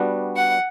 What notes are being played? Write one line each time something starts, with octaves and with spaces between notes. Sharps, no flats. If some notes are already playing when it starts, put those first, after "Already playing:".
Already playing: G3 B3 D4 F#4
F#5